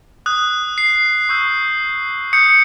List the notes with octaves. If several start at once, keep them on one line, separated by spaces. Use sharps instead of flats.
D#6 F#6
C7
C#6 E6 G6
D#6 G6 C#7